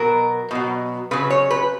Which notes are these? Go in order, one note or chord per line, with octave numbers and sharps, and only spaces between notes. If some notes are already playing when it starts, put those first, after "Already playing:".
Already playing: B2 F#3 A#4
B2 F#3
C#3 F#3 B4
C#5
B4